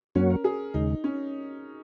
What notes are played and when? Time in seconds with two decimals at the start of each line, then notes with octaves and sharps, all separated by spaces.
0.15 F#2 F#3 A#3 C#4 F#4 C#5
0.30 A#4
0.44 G#4
0.74 D#2 C#3 G#3 D#4
1.04 C#4